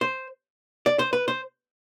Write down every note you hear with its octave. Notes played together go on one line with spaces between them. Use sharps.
C5
D5
C5
B4
C5